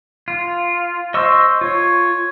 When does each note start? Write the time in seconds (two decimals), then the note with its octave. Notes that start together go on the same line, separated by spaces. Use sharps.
0.28 F4
1.14 C5 D#5 C#6 E6
1.61 F4 C#5